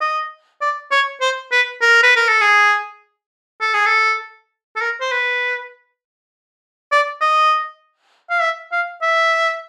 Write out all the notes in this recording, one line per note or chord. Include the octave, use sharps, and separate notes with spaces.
D#5
D5
C#5
C5
B4
A#4
B4
A#4
A4
G#4
A4
G#4
A4
A4
A#4
C5
B4
D5
D#5
F5
E5
F5
E5